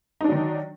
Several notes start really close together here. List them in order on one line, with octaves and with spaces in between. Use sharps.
D#4 D4 F#3 D#3